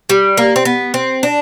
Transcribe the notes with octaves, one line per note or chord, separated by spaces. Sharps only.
G3
A#3
C4
B3
C4
D4